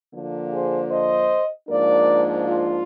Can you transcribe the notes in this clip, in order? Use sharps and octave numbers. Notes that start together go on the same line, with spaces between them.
D3 F3 A#3
G#4 C5
C5 D#5
G#2 F3 A#3 D4 A#4 D5
F4